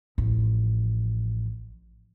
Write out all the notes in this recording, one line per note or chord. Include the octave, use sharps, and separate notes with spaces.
A1 F3